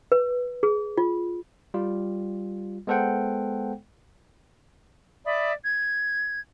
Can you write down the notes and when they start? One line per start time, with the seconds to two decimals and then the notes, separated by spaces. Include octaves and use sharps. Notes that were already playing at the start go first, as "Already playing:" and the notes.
0.12 B4
0.63 G#4
0.98 F4
1.74 G3 F4
2.87 G#3 B3 A4 C5 F#5 G5
5.25 D5 E5 B5 D#6
5.63 G#6